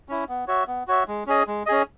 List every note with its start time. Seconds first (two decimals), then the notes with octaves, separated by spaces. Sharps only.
0.09 C#4 E4
0.29 B3
0.48 F#4 C#5 E5
0.68 B3
0.88 F#4 C#5 E5
1.08 G#3
1.27 C#4 G#4 D#5
1.47 G#3
1.66 C#4 G#4 D#5